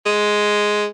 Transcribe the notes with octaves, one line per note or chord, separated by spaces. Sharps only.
G#3